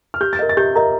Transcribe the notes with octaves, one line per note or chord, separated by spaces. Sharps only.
F6
G4 G6
A6
A#4 D#5
A6
G4 G6
A#4 D#5 A#5